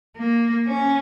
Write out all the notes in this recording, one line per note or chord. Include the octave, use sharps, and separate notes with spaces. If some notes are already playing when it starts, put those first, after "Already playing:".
A#3
C#4